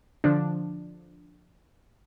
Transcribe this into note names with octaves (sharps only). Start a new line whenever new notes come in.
D3 F3 D4